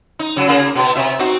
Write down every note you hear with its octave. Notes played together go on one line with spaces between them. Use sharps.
D#4
C#3 F#3
C#3 A#3 G#4
B2 B3
C3 E5
C4 D#4 F#4